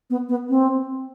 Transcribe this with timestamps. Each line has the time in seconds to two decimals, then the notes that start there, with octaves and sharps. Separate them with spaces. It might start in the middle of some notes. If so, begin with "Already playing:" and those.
0.10 B3
0.29 B3
0.49 C4